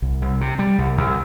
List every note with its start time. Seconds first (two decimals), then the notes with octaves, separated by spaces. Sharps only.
0.02 C2
0.22 C2
0.41 C3
0.59 G3
0.78 C2
0.97 C2